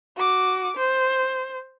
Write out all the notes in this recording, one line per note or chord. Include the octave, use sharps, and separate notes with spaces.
F#4 D6
C5